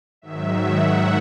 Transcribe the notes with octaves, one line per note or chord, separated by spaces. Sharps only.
G#2 D#3 F#3 E5
F#5